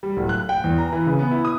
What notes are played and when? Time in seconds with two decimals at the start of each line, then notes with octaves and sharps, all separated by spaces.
0.03 G3
0.17 D1
0.29 F#6
0.49 G5
0.64 E2
0.78 A#5
0.93 E3
1.07 C#3
1.19 B3
1.31 E4
1.45 D#6